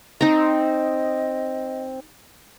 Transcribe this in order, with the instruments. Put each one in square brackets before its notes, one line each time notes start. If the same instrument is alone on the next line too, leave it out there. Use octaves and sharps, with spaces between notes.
[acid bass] C4 [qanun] D#4 A#5 [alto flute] D#5